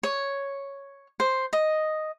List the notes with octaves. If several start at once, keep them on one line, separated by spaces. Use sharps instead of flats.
C#5
C5
D#5